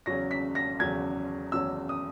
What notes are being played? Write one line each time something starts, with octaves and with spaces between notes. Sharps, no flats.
E2 C#3 F#3 C#4 A#6
B6
A#6
E2 C#3 F#3 C#4 G#6
E2 C#3 F#3 C#4 E6
D#6